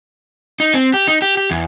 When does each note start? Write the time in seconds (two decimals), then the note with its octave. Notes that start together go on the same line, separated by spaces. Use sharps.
0.60 D#4
0.74 C4
0.94 G4
1.08 D#4
1.22 G4
1.37 G4
1.51 E2